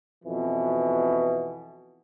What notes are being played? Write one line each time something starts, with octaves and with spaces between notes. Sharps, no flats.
F2 B2 E3